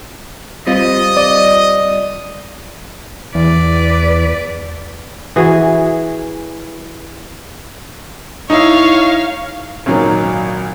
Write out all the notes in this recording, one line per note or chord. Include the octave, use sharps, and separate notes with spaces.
G3 C4 F4 D#5
D5
E2 B4 D5
E3 F#4 G#4
D#4 E4 C#5 F5
G#1 A#2 F#3 D#4 A#4